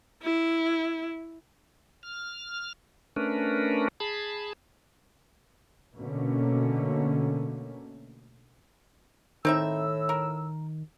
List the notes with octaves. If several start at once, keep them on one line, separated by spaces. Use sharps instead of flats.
E4
F6
A3 C#4 D4 A#4 B4
G#4 A5 B5
B2 D3 A3 A#3 C#4
A2 D#3 C4 D#4 E5 E6
A#4